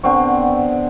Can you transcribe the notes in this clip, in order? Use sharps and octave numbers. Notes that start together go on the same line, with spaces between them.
D3 B3 C4 C#6